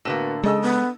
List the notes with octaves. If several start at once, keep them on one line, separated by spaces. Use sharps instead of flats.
A2 D3 A#3 B3 F#4 E7
C#3 G#3 G#4 A4 D#5 E6
B3